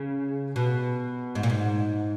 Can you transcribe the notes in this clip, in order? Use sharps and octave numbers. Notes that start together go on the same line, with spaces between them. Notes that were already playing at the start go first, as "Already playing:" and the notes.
Already playing: C#3
B2
G#2
A#2
G#2